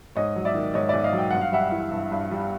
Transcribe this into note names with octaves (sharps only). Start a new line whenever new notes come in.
G#2 C#5 D#5
F#3
D5 E5
D#3
G#2 C#5 D#5
G#2 D5 E5
D#5 F5
F#3
G5
G2 F#5
F5
G3 E5 F#5
E3
G2
G2
G3